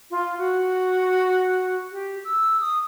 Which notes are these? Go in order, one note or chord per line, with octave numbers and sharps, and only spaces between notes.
F4
F#4
G4
E6
D#6